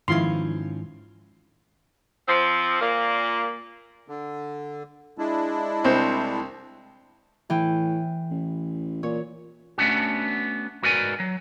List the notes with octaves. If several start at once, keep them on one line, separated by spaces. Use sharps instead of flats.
G#2 D#3 F3 C#4 E4 F4 C6
F3 C4
A#2 A#3
D3
G#3 D4 E4
C2 C5
A2 E3 G5
A1
A#2 C#5
A3 B3 C#4 D4 F#4
G#2 F#4 A#4 B4 D5 G#5
F#3